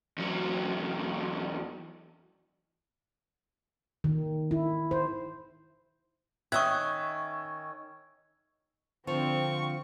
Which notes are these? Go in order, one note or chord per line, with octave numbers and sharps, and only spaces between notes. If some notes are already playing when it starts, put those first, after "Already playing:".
E2 F#3
D#3
E4
C5
D#3 C#4 E5 C#6 D#6 E6 F#6 G#6
D3 F3 C4 C#6